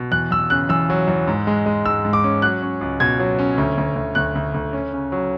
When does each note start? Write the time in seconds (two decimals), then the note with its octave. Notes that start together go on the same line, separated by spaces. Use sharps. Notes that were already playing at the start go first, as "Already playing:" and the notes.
Already playing: B2
0.12 E2 F#6
0.31 E2 E6
0.50 C#3 F#6
0.69 E2 E6
0.90 F#3
1.08 E2
1.28 G#2
1.47 G#3
1.66 G#3
1.85 G#2 E6
2.05 G#2
2.13 D6
2.24 C#4
2.42 F#3 F#6
2.62 C#4
2.81 C#2
3.00 B2 G#6
3.19 F#3
3.39 C#4
3.58 D2
3.78 D2
3.96 D2
4.15 D2 F#6
4.35 D2
4.54 D2
4.73 C#4
4.93 C#3
5.12 F#3